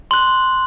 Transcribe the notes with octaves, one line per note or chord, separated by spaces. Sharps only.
C6 F#6 F#7